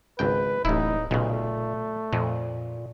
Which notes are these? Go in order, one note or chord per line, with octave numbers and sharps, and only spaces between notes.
G#1 C#2 B4 G5
D1 A1 D#4 E4
B1 A#2 C#3 A3
F2 A#2